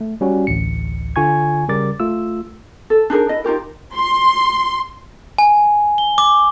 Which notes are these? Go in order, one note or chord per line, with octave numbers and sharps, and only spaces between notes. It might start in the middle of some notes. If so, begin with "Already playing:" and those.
A3
G3 C#4 F#4
A1 D2 C#7
D3 F4 G#5 C#6 G#6
C#3 G3 A#4 D6 A6
A3 F4 E6
A4
D4 D#4 G#4 A#4
E4 D#5
D#4 F4 G4 A#4
C6
G#5
G7
D6